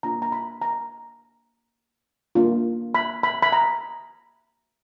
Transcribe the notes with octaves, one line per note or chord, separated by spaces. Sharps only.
A#3 D4 F4 A#5
A#5
B5
A#5
A#3 D4 F4
B5
B5
B5
A#5